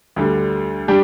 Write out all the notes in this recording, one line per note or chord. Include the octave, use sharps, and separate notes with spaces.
D2 D3 G3
G3 D4 G4